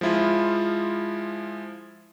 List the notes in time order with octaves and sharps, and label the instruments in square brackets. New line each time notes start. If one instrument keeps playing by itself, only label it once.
[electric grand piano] F3 G#3 E4 F4